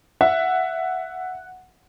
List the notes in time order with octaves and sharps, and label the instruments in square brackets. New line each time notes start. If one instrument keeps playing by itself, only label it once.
[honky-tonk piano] E5 [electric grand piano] F#5